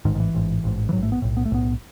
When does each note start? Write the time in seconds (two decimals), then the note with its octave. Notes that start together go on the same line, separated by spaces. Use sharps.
0.05 G#2 D#3
0.08 A1
0.15 D#3
0.20 E3
0.34 A1 G#2
0.64 A1 G#2
0.89 E3
0.92 G#2 F#3
0.97 A1
1.03 A3
1.12 B3
1.22 B1 A2
1.37 B3
1.45 A3
1.51 B1 A2 B3